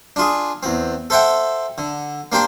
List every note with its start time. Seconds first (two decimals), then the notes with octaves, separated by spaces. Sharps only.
0.16 D4 F4 G#4
0.63 E2 C4
1.10 A4 C5 E5 F#5 G5
1.78 D3
2.32 A#3 D4 G4 C5 G5